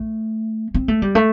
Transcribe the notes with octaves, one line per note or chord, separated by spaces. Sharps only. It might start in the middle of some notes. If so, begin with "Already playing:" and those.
Already playing: A3
C4
A3
G3
A3